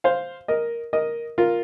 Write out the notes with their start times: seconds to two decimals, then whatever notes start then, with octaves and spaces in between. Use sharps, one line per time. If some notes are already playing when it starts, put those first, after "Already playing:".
0.04 C5 F5
0.48 A#4 D#5
0.93 A#4 D#5
1.38 F4 A#4